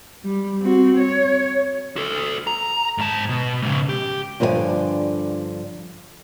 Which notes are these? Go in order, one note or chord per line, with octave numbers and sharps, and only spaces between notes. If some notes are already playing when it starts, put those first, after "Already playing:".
G3
C4 F#4
C#5
F#4 A4
A#5
G#2 A5
B2
G#2 C#3
G4
G2 D3 F3 B4 D5 G#5